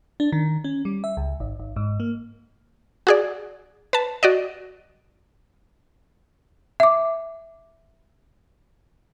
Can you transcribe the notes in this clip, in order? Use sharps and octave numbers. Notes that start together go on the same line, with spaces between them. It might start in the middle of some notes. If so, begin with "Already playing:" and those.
D4
D#3
C#4
G3
E5
C#2
G#1
G#1
G#2
A#3
F#4 G#4 D5
B4 A5
F#4 D5 D#5
E5 D6